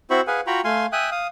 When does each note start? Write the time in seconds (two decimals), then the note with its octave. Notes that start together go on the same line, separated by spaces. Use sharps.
0.10 C4 E4 F#4 C5 B5 C#6
0.27 G#4 B4 F5 F#5 G#5
0.47 F4 F#4 G5 A#5 B5 C#6
0.64 A3 F5 G#5 C6
0.92 E5 G5 G#5 D#6 F#6
1.12 F5 D#6